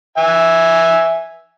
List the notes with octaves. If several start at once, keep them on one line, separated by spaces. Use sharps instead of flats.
E5 G#5